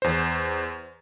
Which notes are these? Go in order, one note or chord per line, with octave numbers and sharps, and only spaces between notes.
E2 C5